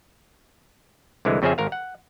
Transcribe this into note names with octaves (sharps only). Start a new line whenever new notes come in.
C2 D3 E3 G#3
F2 C#3 C4 C#4 G#4 E5
G#1 A#4 F5
F#5